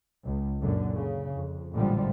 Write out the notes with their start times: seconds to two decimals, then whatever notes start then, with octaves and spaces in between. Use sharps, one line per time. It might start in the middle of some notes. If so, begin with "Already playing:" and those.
0.24 C#2
0.60 F#1 F#2 A#2 D3
0.95 C#3
1.32 F2
1.72 A1 A#2 D3 F3 G3 G#3